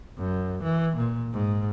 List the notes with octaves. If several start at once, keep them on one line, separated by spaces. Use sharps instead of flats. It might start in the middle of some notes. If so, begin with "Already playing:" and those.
F#2
E3
A#2
G#2